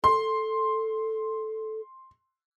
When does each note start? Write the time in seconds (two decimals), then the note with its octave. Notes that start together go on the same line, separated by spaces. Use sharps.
0.04 A4 C6